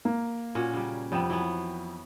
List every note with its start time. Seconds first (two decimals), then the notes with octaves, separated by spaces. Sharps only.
0.05 A#3
0.55 A#2 C#4 F#4
0.73 C#3 G3
1.12 F2 C3 B3 G5 E7
1.30 E3 F#3 B3